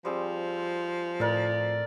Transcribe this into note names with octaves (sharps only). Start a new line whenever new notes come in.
F3 G3 C4 G#4
A2 A4 A#4 D5 D#5